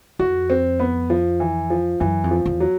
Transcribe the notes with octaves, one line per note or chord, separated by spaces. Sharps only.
F2 F#4
C4
B3
F3
E3
F3
F#2 E3
F2
F3
E2
F#3